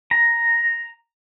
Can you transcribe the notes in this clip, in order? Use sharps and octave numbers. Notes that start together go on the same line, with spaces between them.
A#5